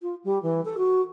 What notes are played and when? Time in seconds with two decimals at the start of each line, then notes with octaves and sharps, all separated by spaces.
0.01 F4
0.23 G3
0.42 E3
0.65 A4
0.77 F#4